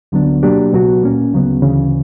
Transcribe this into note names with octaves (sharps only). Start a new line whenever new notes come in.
D2 D3 F#3 B3 D4
B2 F#3 A#3 D4 G4
C#2 B2 F#3 B3 F#4
A#2 A#3 C#4
D2 C#3 F#3 B3
D2 C#3 E3